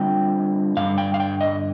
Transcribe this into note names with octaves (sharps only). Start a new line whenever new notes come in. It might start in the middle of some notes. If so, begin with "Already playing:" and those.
Already playing: D3 G3 C4 F4 G5
G2 D3 G3 F5
G5
F5
G5
D#5